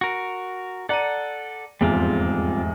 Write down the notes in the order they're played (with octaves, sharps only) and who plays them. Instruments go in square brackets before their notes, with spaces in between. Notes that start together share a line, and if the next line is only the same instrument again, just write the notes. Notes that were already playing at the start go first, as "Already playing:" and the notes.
[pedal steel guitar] F#4 A#4
[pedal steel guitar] A4 F#5 [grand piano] D5 A#5 D#7
[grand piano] F1 E2 G#2 [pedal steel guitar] G3 C4 F4